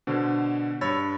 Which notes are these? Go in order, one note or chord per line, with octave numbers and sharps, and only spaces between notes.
B2 D3 C5
G2 C#5 B5 E6 A6